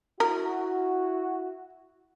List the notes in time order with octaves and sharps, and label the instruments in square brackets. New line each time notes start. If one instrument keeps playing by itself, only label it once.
[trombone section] E4 F#4 [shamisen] A#4